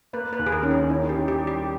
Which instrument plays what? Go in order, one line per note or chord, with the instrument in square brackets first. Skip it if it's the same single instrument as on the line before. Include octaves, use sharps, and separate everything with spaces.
[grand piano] A#3 [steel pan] B4
[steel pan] B4
[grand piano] D#2
[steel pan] G#4
A#4
[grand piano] D#3 [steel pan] C#4
[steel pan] D#4
[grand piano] C#4 [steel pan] E4
[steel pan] G#4
G4
[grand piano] D#3
[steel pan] G4
[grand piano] G3
[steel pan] G4